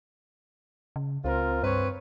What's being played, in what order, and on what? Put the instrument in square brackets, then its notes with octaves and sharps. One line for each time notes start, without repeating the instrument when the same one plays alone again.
[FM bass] C#3
[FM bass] C#2 [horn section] C4 F4 A#4
[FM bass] G2 [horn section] C4 B4 C#5